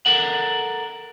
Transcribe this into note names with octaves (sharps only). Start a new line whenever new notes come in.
A4 A#4 F#5